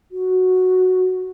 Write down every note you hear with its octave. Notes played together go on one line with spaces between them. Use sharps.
F#4